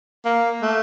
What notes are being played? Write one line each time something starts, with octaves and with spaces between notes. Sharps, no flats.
A#3
A3